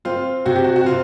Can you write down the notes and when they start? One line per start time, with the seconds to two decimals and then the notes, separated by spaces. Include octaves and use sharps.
0.05 C4 F4
0.46 C3 F#4
0.56 G4
0.64 F#4
0.76 F#4
0.86 C3 F4